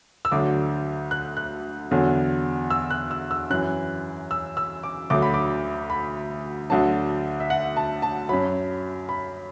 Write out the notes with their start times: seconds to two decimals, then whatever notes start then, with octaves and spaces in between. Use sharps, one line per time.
0.25 E6
0.32 D2 D3 F#3 D6
1.11 F#6
1.37 F#6
1.91 E2 D3 F#3
2.70 E6
2.91 F#6
3.11 E6
3.31 E6
3.50 F#2 E3 F#6
4.31 E6
4.57 E6
4.83 D6
5.10 D2 D3 F#3 D6
5.22 B5
5.34 D6
5.90 B5
6.70 D2 D3 F#3 A5
7.40 E5
7.50 F#5
7.77 A5
8.02 A5
8.29 F#2 F#3 B5
9.09 B5